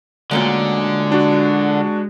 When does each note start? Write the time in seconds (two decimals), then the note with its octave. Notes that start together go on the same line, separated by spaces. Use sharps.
0.31 D2 A#2 D3 G#3 C#4
1.12 D4 F#4